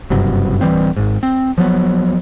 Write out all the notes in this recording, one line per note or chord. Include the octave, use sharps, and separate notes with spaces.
F#1 G2 C3 F#3
D1 E3 G3 C4
G#1 G#2
C4
F3 F#3 B3